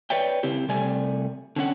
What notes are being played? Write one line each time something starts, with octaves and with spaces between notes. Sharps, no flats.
B4 C#5 D5 E5 G5
C#3 C4 E4 G4
C3 G3 A3 C4 D5 G#5
D3 C4 C#4 F#5